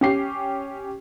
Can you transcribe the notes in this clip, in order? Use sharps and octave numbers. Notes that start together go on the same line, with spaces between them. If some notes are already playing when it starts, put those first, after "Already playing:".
C#4 G4 C7